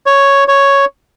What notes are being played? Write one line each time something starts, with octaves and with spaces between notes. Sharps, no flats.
C#5
C#5